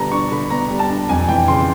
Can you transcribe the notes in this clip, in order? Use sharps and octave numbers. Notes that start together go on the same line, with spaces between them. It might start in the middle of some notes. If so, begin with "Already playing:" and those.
Already playing: D3 G3 B3 D4 A5 A#5
D4 C#6
D3 B5
B3 A#5
G3
A5
D4
F2 G#5
E3 G5
C#3 C6